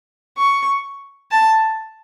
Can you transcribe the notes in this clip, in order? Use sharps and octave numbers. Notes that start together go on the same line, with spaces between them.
C#6
A5